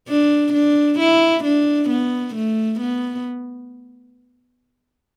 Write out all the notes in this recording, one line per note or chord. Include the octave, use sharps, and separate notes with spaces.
D4
D4
E4
D4
B3
A3
B3